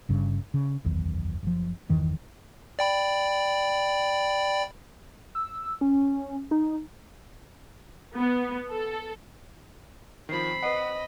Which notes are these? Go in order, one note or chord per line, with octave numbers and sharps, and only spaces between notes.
G1 G2 C#3
C#3
F#1 B1 E2 D#3
F#1 F3
G1 E2 D#3 E3
D5 G5 B5
E6
C#4
D#4
B3
A4
D#3 F3 C4 B5 C7
B4 D#5 F#5